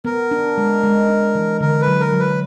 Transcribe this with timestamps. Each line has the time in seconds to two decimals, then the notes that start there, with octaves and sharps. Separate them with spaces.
0.05 B3 A#4
0.31 D4
0.58 G#3
0.83 G#3
1.09 D4
1.35 E3
1.61 D3 A#4
1.81 B4
1.87 F#3
2.00 A#4
2.13 F#3
2.19 B4